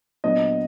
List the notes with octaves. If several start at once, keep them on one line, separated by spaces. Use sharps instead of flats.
A#2 F#3 B3 D4 D#5